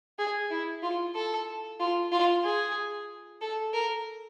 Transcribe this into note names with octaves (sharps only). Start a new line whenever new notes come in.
G#4
E4
F4
A4
F4
F4
G#4
A4
A#4